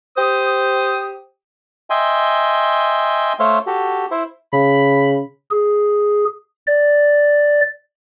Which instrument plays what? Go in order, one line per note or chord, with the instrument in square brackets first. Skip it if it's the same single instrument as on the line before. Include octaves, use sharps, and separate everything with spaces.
[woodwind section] G4 C5 D#6
[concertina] D#5 E5 G5 G#5 C6
A3 C5 C#5 E5 F5 C6
F#4 G4 A4
E4 C5 E5
[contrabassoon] C#3 [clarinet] B5
[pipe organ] G#4
D5